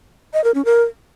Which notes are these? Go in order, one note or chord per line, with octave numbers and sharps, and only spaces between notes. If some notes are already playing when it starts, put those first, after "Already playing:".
D#5
A#4
C#4
A#4